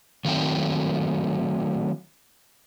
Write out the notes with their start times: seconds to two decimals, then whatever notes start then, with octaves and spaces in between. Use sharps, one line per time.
0.25 D#3 F#3 A3 C4 G5